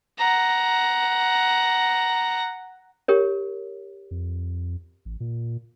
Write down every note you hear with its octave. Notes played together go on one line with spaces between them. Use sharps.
F#5 A#5
G4 A#4 C#5
F2
A1
A#2